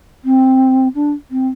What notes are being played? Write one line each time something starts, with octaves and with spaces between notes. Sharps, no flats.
C4
D4
C4